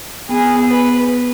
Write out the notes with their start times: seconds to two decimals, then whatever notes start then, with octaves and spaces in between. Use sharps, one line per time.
0.28 B3 G#4
0.69 B4